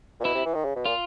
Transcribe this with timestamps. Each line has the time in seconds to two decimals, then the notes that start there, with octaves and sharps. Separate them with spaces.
0.20 A#2
0.24 B2 E4
0.35 C3
0.45 E3
0.54 D#3
0.65 C#3
0.76 B2
0.86 A#2 F4